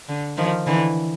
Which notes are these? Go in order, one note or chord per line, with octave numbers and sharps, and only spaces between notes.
D3
D#3 F3
D3 E3